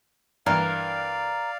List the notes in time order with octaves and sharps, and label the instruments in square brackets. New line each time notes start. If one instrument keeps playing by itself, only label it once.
[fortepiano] G2 E3 [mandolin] A#4 [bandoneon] D5 F5